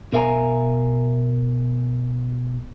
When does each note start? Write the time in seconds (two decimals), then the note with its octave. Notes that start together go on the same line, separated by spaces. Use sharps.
0.13 B2 A#4 E5 F5 G#5 A#5